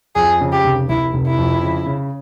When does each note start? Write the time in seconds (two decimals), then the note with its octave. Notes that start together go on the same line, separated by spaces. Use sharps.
0.15 F2 G#4
0.41 C#3
0.52 G4
0.65 F1
0.89 F1 E4
1.14 F1
1.27 E4
1.38 F2
1.63 C#3
1.86 C#3